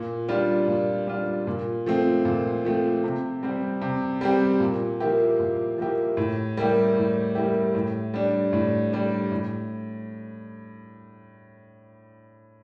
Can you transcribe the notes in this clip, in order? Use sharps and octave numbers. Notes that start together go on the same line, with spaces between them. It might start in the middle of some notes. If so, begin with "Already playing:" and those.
Already playing: A#2
G3 D4 F4
A#2
G3 D4 F4
A#2
F3 A3 C4
A#2
F3 A3 C4
C3
G3 C4 G4
C3
G3 C4 G4
A#2
F3 A#3 E4 G4
A#2
F3 A#3 E4 G4
A2
G3 A#3 E4 G4
A2
G3 A#3 E4 G4
A2
G3 D4
A2
G3 D4
A2